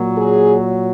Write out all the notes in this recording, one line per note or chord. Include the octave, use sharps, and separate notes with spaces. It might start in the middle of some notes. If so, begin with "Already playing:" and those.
Already playing: A#2 F#3
G#4